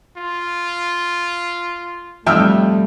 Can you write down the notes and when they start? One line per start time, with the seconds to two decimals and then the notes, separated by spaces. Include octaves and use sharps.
0.17 F4
2.26 F2 G3 A3 E5 G5 A5 E6 F6